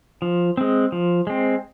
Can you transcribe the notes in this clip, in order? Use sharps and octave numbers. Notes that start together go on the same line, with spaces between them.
F3
G#3 C4
F3
G#3 C4